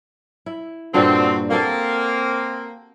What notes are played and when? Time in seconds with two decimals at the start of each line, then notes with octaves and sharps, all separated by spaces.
0.46 E4
0.94 G2 A#2 D3 G3 C4 F#4
1.50 A#3 C4 F#4 A4 C5